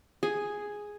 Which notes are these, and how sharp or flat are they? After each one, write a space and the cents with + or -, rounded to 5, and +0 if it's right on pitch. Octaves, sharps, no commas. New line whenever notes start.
G#4 +0 G#5 +0